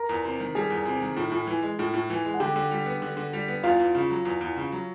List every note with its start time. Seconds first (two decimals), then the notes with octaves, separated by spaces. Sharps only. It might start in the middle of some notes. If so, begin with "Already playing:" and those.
Already playing: A#4 A#5
0.09 E2
0.24 C3
0.40 D#3
0.55 G3 G#4 G#5
0.70 E2
0.85 C3
1.02 D#3
1.16 A2
1.32 A2
1.47 E3
1.63 G#3
1.79 A2
1.94 A2
2.10 E3
2.25 G#3
2.34 F#5
2.40 D3 G4 G5
2.56 D3
2.71 G3
2.86 B3
3.02 D3
3.17 D3
3.33 G3
3.48 B3
3.63 E2 F4 F5
3.79 E2
3.95 C#3
4.10 F#3
4.25 E2
4.41 E2
4.56 C#3
4.72 F#3